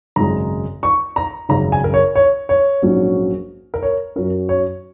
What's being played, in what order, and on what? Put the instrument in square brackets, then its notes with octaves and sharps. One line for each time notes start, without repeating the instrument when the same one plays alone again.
[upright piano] G#1 F#2 C#3 G#3 A#5
C#6
A#5
G#1 F#2 C#3 A#5
G#5
A#4
C#5
C#5
C#5
A#1 G#2 F#3 A#3 C#4
A#4
C#5
F#2 F#3 C#4 A#4
C#5